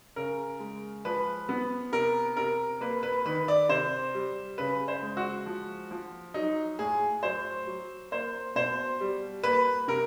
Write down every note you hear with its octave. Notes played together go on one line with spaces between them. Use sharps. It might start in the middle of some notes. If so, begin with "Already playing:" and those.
C#3 A#4
G#3
F3 B4
B3
C3 A#4
C3 A#4
A#3 B4
B4
D#3 B4
D5
C3 C5
G3
C#3 B4
C5
G#3
F#4
F3
F3
F#3 D#4
A2 G#4
F#3 C5
F#3
A#3 C5
B2 C5
G3
A#3 B4
C3 A#4